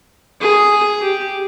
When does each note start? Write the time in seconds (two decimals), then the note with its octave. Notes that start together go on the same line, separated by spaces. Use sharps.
0.41 G#4
1.02 G4